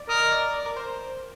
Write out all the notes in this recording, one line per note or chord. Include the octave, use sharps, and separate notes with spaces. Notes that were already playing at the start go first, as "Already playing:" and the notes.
Already playing: D5
A#4 D#5
D5
D5
A#4
C5